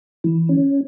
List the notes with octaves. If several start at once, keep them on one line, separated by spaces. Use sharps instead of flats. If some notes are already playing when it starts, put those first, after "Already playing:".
E3
C#4